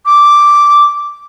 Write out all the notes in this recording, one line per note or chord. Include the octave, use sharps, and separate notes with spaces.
D6